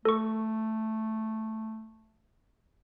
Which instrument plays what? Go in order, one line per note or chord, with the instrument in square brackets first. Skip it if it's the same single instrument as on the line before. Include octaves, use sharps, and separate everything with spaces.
[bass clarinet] A3 [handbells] A4 C#6